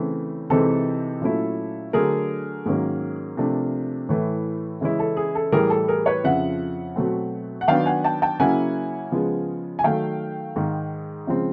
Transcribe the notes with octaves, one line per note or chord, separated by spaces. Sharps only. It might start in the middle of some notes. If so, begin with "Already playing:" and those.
Already playing: C#3 E3 A3 C4
C3 E3 G#3 C4 D#4 A4
A#2 F#3 A3 C#4 E4
D3 F#3 A3 G#4 A#4
G#2 D#3 F#3 A#3 C#4
C3 F3 A3 D4
A2 E3 A3
C#3 E3 G#3 C#4 E4
A4
G#4
A4
A2 E3 G3 G#4 A#4
A4
G#4 A#4
B4 C#5
F2 C#3 F3 E5 F#5
B2 F#3 A3 C4
F#5
D#3 F#3 B3 D4 F5 G5
F#5 G#5
G5 A5
G5 A5
C#3 F#3 A#3 C#4 E4 F#5 G#5
C#3 F3 G#3 B3
G#5
D#3 F#3 A3 F5 G5
G#2 D#3 G#3
C#3 F3 G#3 C4